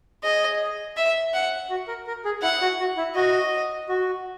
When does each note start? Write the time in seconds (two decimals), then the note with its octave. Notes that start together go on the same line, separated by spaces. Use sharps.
0.24 G#4 D#5
0.97 E5
1.34 F#5
1.70 F#4
1.88 A#4
2.07 A#4
2.25 G#4
2.42 E4 F#5
2.61 F#4
2.80 F#4
2.97 E4
3.16 F#4 D#5
3.89 F#4